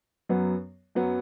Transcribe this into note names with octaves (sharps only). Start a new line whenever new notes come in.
F#2 F#3 B3
F#2 F#3 B3